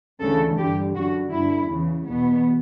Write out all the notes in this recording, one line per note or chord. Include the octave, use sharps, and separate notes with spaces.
D2 C#3 E3 A4
G2 D3 G4
F#2 D3 F#4
G2 D3 E4
E2 C#3 E3
E2 B2 B3